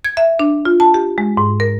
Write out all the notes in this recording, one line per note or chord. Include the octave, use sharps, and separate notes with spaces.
G#6
E5
D4
F4
A5
G4
G#3
G#2
A#4